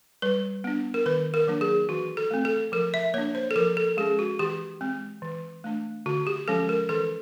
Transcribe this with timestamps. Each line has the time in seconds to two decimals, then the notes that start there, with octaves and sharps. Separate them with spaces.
0.22 G3 B4
0.64 B3 D4
0.94 A#4
1.06 D#3 B4
1.34 A#4
1.48 F#3 A#3 D4
1.61 G#4
1.89 E3 F#4
2.17 A4
2.31 A3 C4
2.45 A4
2.72 F3 A#4
2.94 E5
3.14 A#3 D4 C#5
3.35 C5
3.51 A4
3.56 F3 A#4
3.77 A4
3.97 G#3 C#4 G#4
4.19 F#4
4.39 E3 G4
4.81 G#3 C4
5.22 E3
5.64 A3 D4
6.06 D3 F#4
6.27 G4
6.48 F3 G#3 C#4 A4
6.69 A#4
6.89 E3 A4